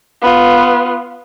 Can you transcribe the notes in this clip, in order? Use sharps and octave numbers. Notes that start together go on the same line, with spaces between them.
B3 F4